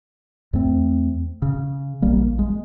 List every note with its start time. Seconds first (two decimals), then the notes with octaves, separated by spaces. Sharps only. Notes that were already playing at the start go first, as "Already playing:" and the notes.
0.53 E2 A3 C4
1.42 C#3
2.02 A#1 G3 A#3
2.39 G#3